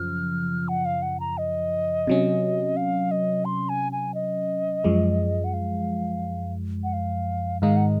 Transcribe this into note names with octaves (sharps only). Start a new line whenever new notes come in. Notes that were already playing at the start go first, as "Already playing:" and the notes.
Already playing: F#2 C#3 F3 F6
F#5
F5
F#5
A#5
D#5
C3 F#3 C#4
F5
D#5
C6
G#5
G#5
D#5
F#2 F3 G#3
F#5
F5
F#5
F5
G#2 D#3 G#3 D#4 F5
F#5